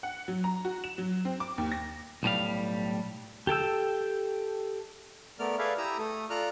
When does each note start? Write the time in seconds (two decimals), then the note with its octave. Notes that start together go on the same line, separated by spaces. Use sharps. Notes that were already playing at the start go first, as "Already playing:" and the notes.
0.03 F#5
0.28 F#3
0.44 A#5
0.65 F#4
0.84 E7
0.98 F#3
1.25 C4
1.40 D6
1.58 D#2
1.72 A#6
2.23 B1 A2 G3 F5
3.47 G4 A4 G5 E6
5.39 A3 B3 A#4 D5 F6
5.58 G#4 A4 B4 D5 E5 F5
5.78 E4 G4 A#5 D#6 E6
5.99 A3 A4 D#6
6.30 F4 A4 D5 A#5 F6 F#6